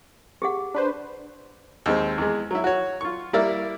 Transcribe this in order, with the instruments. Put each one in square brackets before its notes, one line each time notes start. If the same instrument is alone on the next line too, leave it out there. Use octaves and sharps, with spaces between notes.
[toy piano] G4 G#4 F#5
[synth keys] D4 B4 C5
[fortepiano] D#2 G#3 C4
E2 G#3
F#3 E4
F#4 C#5
F4 C#6
G3 A#3 E4 A#4 D5 E5